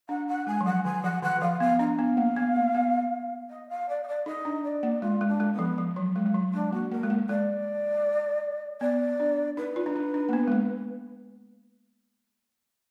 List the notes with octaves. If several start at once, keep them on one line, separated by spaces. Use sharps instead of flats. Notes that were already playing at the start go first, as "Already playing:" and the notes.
D4 F#5
F#5
G#3 G#5
F#3
F3 F#5
D#3 G#5
F3 F#5
D#3 F#5
D#3
F3 F5
B3 F5
D4 F5
B3
A#3
B3
A#3
B3
D#5
F5
D5
D#5
D5
D#4 D#5
D4
D5
A#3
G#3 F4
G#3
D4
G#3
B3
F3
F3
F#3
G#3
G#3
F#3
G#3 D4
A#3 F#4
A#3 A#4
G#3
A#3
G#3 D5
B3 D5
D4
D#4 B4
F4
D4
D#4
D4
A#3
B3
G#3
A#3